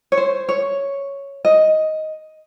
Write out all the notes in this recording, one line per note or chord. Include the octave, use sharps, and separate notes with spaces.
C#5
C5
C#5
D#5